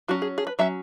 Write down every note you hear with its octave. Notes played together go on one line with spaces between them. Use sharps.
F#3 C#4 F#4
G#4
G#4
B4
F#3 C#4 E5